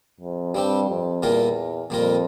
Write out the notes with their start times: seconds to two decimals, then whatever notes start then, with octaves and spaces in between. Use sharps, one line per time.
0.20 F2
0.54 G2 G3 C4 G4
0.89 F2
1.22 E2 A#2 G3 A#3 F4 A#4
1.90 F2 A#2 G3 A#3 F4 A#4